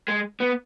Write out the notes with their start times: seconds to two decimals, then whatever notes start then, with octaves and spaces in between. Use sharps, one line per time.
0.08 G#3
0.40 B3